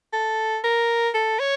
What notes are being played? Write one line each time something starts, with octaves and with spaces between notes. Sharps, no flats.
A4
A#4
A4
C#5